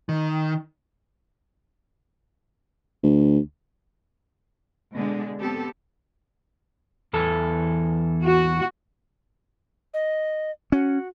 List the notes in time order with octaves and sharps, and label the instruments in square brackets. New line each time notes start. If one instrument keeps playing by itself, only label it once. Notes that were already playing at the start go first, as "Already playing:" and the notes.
[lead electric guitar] D#3
[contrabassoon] D2
[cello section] B2 D3 G#3 D4
B3 C4 G4 A4
[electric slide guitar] E2 E3 A4
[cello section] F#4
[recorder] D#5
[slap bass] C#4 [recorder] F#4